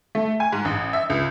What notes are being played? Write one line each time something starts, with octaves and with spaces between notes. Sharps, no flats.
A3
G#5
G#2
A1
E5
C#2